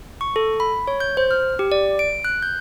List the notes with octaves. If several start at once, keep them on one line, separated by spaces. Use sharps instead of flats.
C#6
A4
B5
C#5
G6
C5
F6
G4
D5
D7
F#6
G6